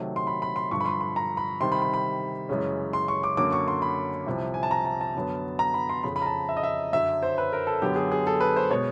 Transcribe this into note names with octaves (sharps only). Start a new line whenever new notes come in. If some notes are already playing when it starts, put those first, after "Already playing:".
Already playing: C3 D#3 F#3 A3
C6
B5
B5
C6
G2 D3 F3 C#6
B5
C6
B5
A#5
B5
C3 D#3 G3 C4 C6
B5
B5
B5
F#2 C#3 E3 G#3 C#4
C6
C#6
D6
F#2 D3 F#3 A#3 C#4 D6
C#6
C6
B5
C2 C3 F3
G#5
A5
A#5
A5
A5
F#2 D3 F#3 B3
A#5
B5
C6
F2 C#3 F3 B5
B5
A#5
A5
E5
D#5
E5
F#2 D3 F#3 E5
C5
B4
A#4
A4
F#2 D3 F#3 B3 G4
G#4
G#4
A4
B4
C5
B2 G#3 C#5